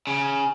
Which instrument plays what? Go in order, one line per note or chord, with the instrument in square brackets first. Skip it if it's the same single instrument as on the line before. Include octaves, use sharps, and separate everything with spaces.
[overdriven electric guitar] C#3